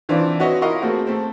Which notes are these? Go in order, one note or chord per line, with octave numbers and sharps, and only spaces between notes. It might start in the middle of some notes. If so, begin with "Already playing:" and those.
D#3 E3 C4 D4 F4 D5
F#4 B4 C#5 D#5 E5 F#5
E4 F4 A#4 D#5 F5 F#5
A3 A#3 C4 F#4 G#4
A3 C4